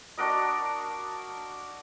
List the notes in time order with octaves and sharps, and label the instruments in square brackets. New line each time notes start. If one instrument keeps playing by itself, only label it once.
[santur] D4 F#4 A#4 D#5